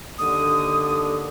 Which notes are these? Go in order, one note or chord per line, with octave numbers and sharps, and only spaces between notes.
D#2 D3 D#6